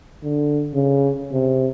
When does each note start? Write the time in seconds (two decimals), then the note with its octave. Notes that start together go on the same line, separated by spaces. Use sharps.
0.23 D3
0.74 C#3
1.32 C3